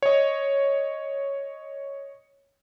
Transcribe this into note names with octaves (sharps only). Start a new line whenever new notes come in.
C#5 D#5